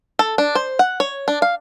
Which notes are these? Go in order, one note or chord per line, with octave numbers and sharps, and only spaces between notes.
A4
D4
C5
F#5
C#5
D4
F5